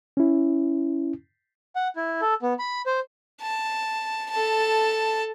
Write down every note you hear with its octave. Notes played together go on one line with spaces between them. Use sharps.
C#4 E4
F#5
E4
A4
B3
B5
C5
A5
A4 A5